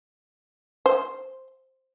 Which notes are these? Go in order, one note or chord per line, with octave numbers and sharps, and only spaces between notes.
C5